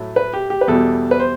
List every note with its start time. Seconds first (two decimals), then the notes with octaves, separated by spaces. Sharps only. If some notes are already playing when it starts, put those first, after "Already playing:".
Already playing: A2 F#3 A3
0.16 B4
0.33 G4
0.50 G4
0.61 B4
0.68 E2 B2 G3 A4
1.11 B4
1.20 C5